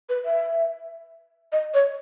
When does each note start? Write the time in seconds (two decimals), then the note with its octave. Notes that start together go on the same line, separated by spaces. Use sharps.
0.09 B4
0.25 E5
1.52 D#5
1.74 C#5